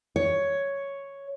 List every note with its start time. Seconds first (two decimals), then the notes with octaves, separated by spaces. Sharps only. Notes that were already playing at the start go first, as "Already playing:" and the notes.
0.16 C#5